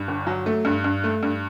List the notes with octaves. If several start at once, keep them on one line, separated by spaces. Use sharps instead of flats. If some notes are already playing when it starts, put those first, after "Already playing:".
Already playing: G2
G1
F#3
A3
G2
G2
A3
G2